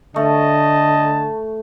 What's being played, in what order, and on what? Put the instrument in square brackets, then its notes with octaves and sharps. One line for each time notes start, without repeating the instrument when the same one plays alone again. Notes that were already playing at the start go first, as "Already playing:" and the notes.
[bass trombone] D3 [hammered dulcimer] A3 [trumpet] D#5 [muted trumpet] A5